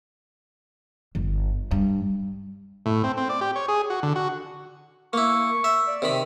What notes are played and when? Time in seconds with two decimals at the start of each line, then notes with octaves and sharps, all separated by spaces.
1.15 G1
1.71 G2
2.86 A2
3.03 C4
3.17 C4
3.29 D5
3.41 G4
3.56 C#5
3.68 G#4
3.90 F#4
4.03 D3
4.16 F#4
5.13 A#3 E4 C#6
5.64 E5
5.87 D5
6.02 C3 D#3 B5